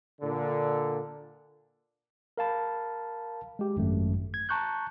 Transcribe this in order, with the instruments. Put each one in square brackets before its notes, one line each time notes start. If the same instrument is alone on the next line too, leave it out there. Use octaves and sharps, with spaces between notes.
[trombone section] A#2 D3
[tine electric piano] A#4 F5 A5 B5
G#3 G4
G#1 F#2 A3
G#6
A5 A#5 C#6 F#6 G6